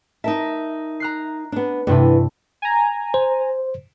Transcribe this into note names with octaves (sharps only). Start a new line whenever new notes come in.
D#4 A#4 E5 A5
A#5 F#6 C7
B3 D4
G2 C3 E3 A3 B3 D4
G#5 A#5
C5